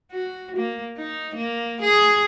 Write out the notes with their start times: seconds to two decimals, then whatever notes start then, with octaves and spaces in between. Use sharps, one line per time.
0.12 F#4
0.57 A#3
0.97 D#4
1.36 A#3
1.82 G#4